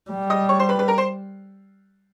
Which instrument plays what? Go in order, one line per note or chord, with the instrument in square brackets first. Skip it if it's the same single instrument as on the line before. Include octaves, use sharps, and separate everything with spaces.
[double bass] G3
[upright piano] D#5 D#6
C#5 C#6
C5 C6
B4 B5
B4 B5
A#4 A#5
C5 C6